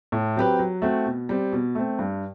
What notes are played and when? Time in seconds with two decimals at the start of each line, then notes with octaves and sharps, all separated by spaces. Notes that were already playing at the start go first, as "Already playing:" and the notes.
0.12 A2
0.36 F#3 C4 G4 B4
0.59 F#3
0.82 A3 C4 F#4
1.06 B2
1.29 G3 C4
1.52 B2
1.75 A3 C4
1.99 G2